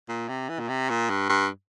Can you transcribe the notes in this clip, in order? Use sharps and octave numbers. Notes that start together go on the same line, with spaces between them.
A#2
C3
E3
A#2
C3
A#2
G2
G2